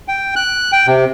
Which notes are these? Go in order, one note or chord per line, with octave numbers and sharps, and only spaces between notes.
G5
F#6
G5
C3